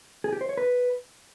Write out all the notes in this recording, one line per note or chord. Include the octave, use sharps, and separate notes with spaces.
G#4
G4
C5
C#5
B4